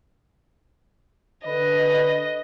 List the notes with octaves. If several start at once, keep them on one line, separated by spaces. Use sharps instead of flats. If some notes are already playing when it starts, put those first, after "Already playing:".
D3 B4 D#5